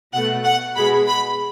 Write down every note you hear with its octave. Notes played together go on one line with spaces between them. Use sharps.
B2 A3 F#5
F#5
B2 G#3 B5
B5